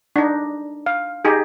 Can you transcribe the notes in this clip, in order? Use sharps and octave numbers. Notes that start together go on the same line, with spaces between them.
D4 D#4
F5
D#4 G4 G#4